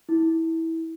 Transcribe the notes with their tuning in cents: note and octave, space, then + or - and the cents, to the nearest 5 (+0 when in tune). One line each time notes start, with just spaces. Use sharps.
E4 -20